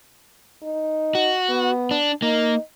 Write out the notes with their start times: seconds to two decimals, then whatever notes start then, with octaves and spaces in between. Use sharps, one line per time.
0.63 D#4
1.15 F#4
1.50 B3
1.91 D4
2.22 A#3 D#4